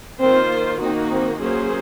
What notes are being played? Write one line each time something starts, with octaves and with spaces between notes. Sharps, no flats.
D#3 A#3 C4 F4 C5
D#3 A#3 C4 D#4 F#4
C4
F#3 A#3 C#4 G#4 C5